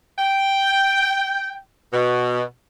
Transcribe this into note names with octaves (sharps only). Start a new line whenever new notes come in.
G5
B2